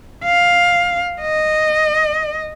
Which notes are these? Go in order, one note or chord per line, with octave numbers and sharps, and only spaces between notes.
F5
D#5